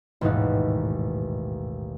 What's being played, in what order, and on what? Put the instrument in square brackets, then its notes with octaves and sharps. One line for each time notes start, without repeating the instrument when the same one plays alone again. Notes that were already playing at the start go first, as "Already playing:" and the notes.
[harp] A1 D#2 G#2 B2 D#4 F#5